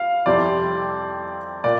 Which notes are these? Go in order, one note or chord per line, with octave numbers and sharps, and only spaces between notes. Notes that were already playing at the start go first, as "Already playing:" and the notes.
Already playing: F5
F2 C3 G3 C4 E4 D5
A#2 D5